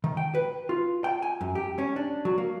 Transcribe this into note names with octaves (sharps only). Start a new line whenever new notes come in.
D#3
G5
B4
F4
G5
G#5
F#2
G4
C#4
D4
F#3
A#3